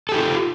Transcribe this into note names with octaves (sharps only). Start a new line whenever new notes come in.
D#4 F4 G4 A4